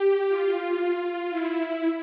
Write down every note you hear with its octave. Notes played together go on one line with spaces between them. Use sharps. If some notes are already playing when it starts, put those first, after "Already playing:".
Already playing: G4
F4
E4